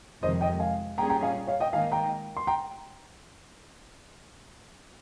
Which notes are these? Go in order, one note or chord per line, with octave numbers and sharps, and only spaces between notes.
F2 C3 D#3 G#3 C5 D#5
D#5 G5
F5 G#5
A#2 G3 C#4 G#4 G5 A#5
G5 A#5
F5 G#5
C#5 F5
D#5 G5
G#2 D#3 A#3 D#4 F5 G#5
G5 A#5
C6
G5 A#5